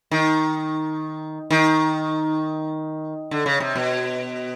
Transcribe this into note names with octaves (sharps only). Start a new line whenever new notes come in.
D#3
D#3
D3
C#3
C3
B2